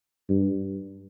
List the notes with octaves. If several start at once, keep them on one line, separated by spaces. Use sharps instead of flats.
G2